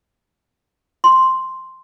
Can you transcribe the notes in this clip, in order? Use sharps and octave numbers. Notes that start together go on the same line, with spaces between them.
C6